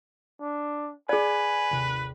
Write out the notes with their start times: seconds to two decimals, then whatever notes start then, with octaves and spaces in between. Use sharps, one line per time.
0.41 D4
1.09 G#4 B4 D5 G#5
1.71 G1 D#2 C3